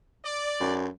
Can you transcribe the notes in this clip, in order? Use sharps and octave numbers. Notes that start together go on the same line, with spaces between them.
D5
F#2